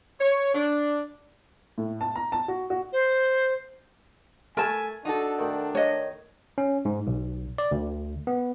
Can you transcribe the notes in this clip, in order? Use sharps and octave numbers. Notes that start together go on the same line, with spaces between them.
C#5
D4
A2
A5
A#5
A5
F#4
F#4
C5
A3 A#4 G#5 A5
D4 D#4 F#4 A4
D2 D#3
C#5 D#5
C#4
G#2
B1
D5
D2
B3